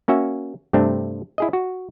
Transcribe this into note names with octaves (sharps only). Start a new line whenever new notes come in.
A#3 C#4 F#4 E5
G2 C3 A3 C4 D4
E4 G#4 D#5
F#4